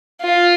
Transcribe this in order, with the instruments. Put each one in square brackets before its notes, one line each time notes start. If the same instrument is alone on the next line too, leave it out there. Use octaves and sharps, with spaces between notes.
[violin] F4